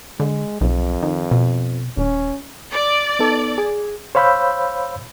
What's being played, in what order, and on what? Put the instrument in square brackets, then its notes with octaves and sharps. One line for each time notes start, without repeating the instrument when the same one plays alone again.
[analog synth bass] D3 [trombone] G#3
[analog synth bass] B1 [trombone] F2
[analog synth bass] D#3
B2
[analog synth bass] D#1 [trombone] C#4
[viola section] D5
[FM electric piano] B3 D#4 A4
G#4 G#5
[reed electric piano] C5 C#5 F5 B5 E6 G6